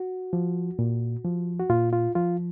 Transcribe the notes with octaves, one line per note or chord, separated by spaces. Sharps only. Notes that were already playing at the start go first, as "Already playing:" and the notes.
Already playing: F#4
F3
A#2
F3
F#4
A#2 F4
F4
F3 F4